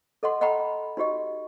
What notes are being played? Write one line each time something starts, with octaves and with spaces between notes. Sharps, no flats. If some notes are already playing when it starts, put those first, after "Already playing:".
A4 D#5 F#5 C6
D#5 F#5 G5 A#5 B5
D#4 F#4 G4 D#5